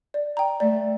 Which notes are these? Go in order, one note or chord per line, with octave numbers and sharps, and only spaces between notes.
D5
G5 A#5
A3 D5